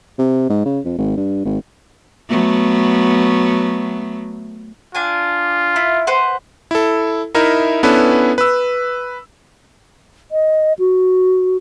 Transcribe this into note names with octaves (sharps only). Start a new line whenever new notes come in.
C3
G#2
C#3
F2
G#1
G2
G#1
F#3 A3 B3
D4 F4 G#5
E4
B4 C5 F#5
E4 A4
D#4 E4 A#4 E5
B3 C#4 D4 E4 A4 B4
B4 E6
D#5
F#4